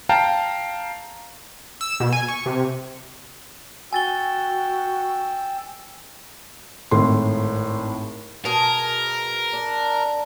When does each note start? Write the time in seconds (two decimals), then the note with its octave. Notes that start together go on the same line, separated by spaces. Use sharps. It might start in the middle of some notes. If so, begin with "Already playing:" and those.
0.09 F5 G5 A5 A#5
1.81 E6
2.00 B2
2.12 G#5
2.28 C#6
2.46 C3
3.93 F#4 G5 G#5 E6 A6 G7
6.91 G#1 A2 C6
8.45 B2 G#4 A#4 A5
9.53 D4